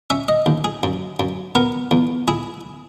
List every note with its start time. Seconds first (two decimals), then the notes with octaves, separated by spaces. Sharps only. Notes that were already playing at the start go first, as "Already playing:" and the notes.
0.10 C#4 E5
0.28 D#5
0.46 D#2
0.64 G#4
0.83 F#2
1.20 F#2
1.55 B3 A#4
1.91 E2
2.28 E4 G#4